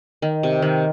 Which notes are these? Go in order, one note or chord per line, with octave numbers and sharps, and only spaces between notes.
D#3
C3
D#3